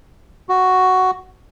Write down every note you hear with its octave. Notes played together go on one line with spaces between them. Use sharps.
F#4